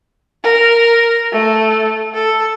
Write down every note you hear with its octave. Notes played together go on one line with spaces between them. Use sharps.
A#4
A3
A4